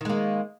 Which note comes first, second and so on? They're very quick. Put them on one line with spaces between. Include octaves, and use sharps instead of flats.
D#3 G#3 A#3